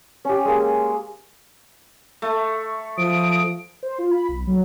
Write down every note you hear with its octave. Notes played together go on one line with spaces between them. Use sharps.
C#4 G4
G#3 A#3
A3
F3 D#6 D7
C5
F4
B5
B1
F#3